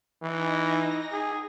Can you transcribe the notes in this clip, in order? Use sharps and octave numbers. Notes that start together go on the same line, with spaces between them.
E3 D#4 A#6
G#4